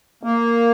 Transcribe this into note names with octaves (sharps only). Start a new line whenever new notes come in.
A#3